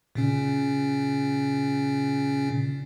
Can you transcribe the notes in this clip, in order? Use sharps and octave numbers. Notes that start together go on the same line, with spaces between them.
A#2 C#3 C#4